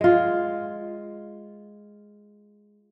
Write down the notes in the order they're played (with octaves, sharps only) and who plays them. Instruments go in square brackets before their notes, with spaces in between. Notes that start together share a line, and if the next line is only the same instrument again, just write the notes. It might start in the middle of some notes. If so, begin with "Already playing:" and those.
[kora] G#3 F4